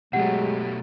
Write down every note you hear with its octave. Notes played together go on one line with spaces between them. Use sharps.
B2 F#3 G#3 A3 G4 F#5